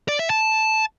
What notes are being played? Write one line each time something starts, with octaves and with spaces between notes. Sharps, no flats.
D5
E5
A5